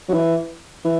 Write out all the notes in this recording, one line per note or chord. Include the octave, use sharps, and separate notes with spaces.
F#3
E3
E3